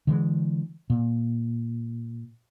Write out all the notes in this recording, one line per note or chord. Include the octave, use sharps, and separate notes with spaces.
D3 E3 G#3
A#2